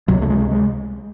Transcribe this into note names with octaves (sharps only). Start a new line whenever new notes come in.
C#2 C3 F#3
A3
G#3
G#3